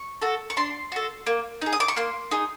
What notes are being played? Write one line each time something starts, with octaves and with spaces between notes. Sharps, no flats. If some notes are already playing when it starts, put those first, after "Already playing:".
Already playing: C#6
F#4 A4
C#6
D4 C6
F#4 A4
A#3
D#4 G#4
D#6
D6
C#6
A#3 C6
D#4 G#4